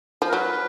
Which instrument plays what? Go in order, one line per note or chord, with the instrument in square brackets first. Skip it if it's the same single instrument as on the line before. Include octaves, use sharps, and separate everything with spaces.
[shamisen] F3
[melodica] A#4
[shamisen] F#3 [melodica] B4